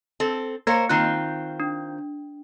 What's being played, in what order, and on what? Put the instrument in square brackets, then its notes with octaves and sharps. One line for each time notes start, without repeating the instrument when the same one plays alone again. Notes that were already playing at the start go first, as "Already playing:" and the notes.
[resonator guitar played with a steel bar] C4 A4
[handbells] A#3 F5 C#7 [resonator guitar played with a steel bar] A#4 C5 C#5
[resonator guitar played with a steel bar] D#3 C4 F4 [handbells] F#6 G6 C7
[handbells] D4